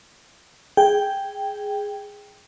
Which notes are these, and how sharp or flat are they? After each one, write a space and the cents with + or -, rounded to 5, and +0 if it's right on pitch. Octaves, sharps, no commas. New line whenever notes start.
G#4 +0 G5 +0